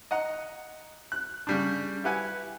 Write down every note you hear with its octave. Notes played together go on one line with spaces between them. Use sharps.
D#5 F#5 A#5
F#6
C#3 G3 D4
E4 G4 B4 F#5 G#5